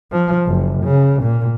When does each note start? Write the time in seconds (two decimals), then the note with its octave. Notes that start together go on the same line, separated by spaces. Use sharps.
0.12 F3
0.47 F#1
0.83 C#3
1.23 A#2